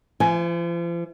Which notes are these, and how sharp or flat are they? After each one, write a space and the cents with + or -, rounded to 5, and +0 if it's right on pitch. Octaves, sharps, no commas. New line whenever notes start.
F3 -40 G#5 +15